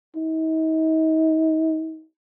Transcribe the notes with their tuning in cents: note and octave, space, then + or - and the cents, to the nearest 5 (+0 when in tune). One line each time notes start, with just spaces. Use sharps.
D#4 +40